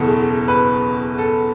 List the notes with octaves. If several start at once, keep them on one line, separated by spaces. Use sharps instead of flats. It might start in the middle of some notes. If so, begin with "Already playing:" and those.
Already playing: F#1 E2 B2 A4
B4
A4